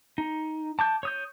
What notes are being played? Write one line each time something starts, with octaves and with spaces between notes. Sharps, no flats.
D#4
A5 D6 G6
C#5 D#6 G6